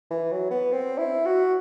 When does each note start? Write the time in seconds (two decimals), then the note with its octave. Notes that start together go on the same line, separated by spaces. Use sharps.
0.11 E3
0.32 F#3
0.51 B3
0.72 C4
0.98 E4
1.26 F#4